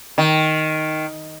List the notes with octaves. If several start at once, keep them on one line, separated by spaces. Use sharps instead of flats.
D#3